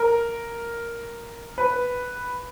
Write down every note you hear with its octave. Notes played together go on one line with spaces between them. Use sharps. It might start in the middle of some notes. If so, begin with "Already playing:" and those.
Already playing: A#4
B4